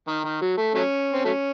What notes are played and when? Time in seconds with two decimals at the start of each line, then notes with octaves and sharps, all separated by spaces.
0.08 D#3
0.25 D#3
0.42 F#3
0.57 A3
0.75 F#3 A3 C#4
1.13 C4
1.25 F#3 A3 C#4